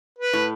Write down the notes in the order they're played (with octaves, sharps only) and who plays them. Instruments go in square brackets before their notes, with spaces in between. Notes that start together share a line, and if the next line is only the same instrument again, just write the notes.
[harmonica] B4
[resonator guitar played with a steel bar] A2